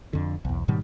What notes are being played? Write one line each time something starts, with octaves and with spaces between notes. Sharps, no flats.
F2 D3
B1 E2
G#2 B2 D#3 G3